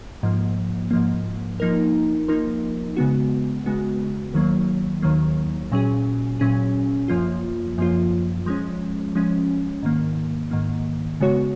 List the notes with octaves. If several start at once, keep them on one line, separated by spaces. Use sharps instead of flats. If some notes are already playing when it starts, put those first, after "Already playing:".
G#2 F3 A#3
G#2 F3 A#3
F3 A#3 D#4 A#4
F3 A#3 D#4 A#4
C#3 G#3 B3 F#4
C#3 G#3 B3 F#4
D#2 D#3 F#3 A#3
D#2 D#3 F#3 A#3
A#2 F#3 C#4 G#4
A#2 F#3 C#4 G#4
F#2 F3 A#3 F4
F#2 F3 A#3 F4
F3 G#3 C#4
F3 G#3 C#4
G#2 D#3 A#3
G#2 D#3 A#3
C#3 G#3 B3 F#4 C#5